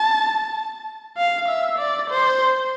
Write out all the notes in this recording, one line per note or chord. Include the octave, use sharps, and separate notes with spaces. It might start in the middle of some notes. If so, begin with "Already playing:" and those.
Already playing: A5
F5
E5
D5
C5